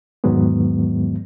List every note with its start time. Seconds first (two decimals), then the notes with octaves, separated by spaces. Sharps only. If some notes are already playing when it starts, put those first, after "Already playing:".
0.24 E2 G#2 D#3 F#3 G#3 B3